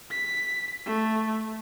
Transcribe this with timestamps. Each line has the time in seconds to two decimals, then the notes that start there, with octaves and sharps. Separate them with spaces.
0.11 B6
0.86 A3